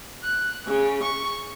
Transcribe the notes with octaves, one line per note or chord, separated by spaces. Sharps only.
F#6
C#3
C#6